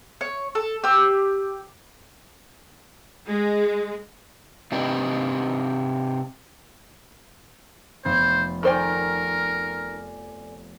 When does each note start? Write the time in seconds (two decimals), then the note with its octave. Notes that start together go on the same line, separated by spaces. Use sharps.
0.21 C#5
0.55 A4
0.84 G4 E6
3.28 G#3
4.72 C3 C4 D4 D#4 G4 B4
8.05 F1 B3 C5 A6
8.63 D#3 A4 A#4 C5 D5 G5 G#5